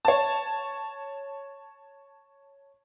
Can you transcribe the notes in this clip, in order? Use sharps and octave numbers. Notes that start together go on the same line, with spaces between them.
C#5 A5